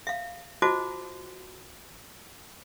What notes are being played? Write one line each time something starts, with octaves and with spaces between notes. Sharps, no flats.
E5 F5
F4 F#4 C5 D#5 A5 D6